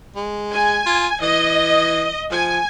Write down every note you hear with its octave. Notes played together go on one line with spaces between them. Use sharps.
G#3
G#5
F4
E3 D#5
F3 G#5